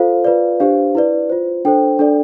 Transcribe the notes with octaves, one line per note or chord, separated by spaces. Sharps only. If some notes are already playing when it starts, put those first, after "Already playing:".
Already playing: F4 A4 C5 F5
F4 B4 D5
D4 G4 C5 F5
E4 B4 D5
F4 C5
D4 A4 C5 G5
D4 A4 D5